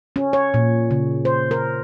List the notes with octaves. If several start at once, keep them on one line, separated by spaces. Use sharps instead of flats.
C#4
C#5
A#2
C#3
C5
A#4